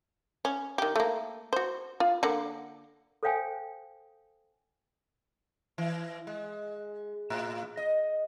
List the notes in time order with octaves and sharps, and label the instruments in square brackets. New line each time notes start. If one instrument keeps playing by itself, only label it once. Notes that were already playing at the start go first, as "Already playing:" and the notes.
[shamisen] C#4
D#3 G4
A3 A#3
F#4 C5
F4
D3 A#3 F#5
[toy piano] A4 C5 C#5 F5 G5 G#5
[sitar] E3
G#3
A2
D#5